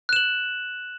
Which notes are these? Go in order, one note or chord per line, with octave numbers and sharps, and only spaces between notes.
F#6 E7 F#7